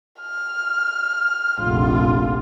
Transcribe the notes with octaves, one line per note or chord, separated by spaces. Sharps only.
F6
F1 A#1 F4